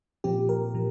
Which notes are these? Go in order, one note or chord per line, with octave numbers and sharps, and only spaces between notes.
A#2 F3 C4 G4
A#4
A#2 F3